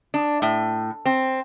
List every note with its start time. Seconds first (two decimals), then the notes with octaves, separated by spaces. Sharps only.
0.14 D4
0.42 A2
1.06 C4